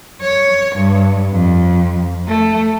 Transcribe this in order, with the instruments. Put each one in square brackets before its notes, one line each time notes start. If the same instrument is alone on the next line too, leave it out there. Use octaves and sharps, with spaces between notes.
[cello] C#5
G2
F2
A3